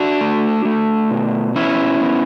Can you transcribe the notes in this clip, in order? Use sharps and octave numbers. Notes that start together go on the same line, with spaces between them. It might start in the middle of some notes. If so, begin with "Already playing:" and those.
Already playing: D4 F#4
A3
A3
B2
B3 C#4 E4
B3